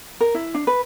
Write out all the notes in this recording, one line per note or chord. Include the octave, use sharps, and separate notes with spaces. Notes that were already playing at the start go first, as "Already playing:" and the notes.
A#4
E4
D4
B4